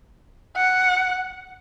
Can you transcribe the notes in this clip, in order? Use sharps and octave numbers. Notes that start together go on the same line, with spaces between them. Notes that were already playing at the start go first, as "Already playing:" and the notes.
F#5